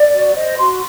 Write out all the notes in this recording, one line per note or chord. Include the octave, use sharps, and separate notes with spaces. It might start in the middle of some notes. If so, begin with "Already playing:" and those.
Already playing: D5
F#4
C5 D#5
F#4 C6